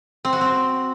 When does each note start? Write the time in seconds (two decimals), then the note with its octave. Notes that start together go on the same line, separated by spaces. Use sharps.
0.25 C4
0.33 F#4
0.41 C4